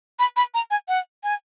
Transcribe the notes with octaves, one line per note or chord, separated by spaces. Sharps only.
B5
B5
A#5
G#5
F#5
G#5